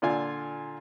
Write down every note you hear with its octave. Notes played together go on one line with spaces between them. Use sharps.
A#2 D3 F4 G#5